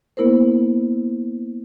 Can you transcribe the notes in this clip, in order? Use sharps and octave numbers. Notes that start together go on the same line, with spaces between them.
A#3 B3 E4 A#4 C5